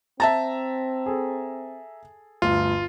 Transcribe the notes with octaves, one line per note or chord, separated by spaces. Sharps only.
C4 E5 A5 A#5 A6
G#4 A4
G1 D2 F4